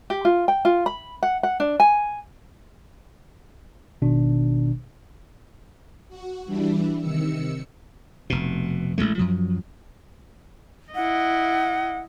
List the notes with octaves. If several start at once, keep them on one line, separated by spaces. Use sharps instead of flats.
G4
F4
G5
F4
B5
F#5
F#5
D4
G#5
G#1 B2 D#3 D4
F#4
E3 G3 D4 E4
C3 D#3 E6 C#7
F1 B2
A1 D#3 G#3 A3
F#2 F3 F#3
E4 D#5 F#5